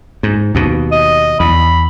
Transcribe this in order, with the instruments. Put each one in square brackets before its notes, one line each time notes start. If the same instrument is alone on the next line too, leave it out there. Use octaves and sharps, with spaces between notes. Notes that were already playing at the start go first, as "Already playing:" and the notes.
[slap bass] G#2
D#2 B2
[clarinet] D#5
[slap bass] E2 [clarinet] B5